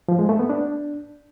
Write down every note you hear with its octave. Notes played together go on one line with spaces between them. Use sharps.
F3
G#3
A3
B3
D4